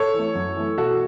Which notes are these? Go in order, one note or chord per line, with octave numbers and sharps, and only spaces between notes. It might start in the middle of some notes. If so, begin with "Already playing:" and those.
Already playing: A4 C#5
E3 A3
F#2
E3 A3
B2 F#4 A4